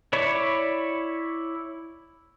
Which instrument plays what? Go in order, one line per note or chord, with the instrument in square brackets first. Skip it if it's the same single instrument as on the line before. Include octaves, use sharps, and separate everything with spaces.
[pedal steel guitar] E4 C#5 D5 B5 C#6